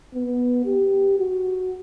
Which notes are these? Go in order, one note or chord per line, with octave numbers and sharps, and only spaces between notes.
B3
G4
F#4